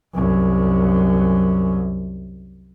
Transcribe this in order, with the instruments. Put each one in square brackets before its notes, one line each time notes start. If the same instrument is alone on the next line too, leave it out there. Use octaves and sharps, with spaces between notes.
[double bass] C2 F#2